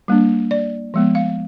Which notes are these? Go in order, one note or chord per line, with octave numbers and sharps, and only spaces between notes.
G3 A#3 D4
D5
F3 G#3 B3
F5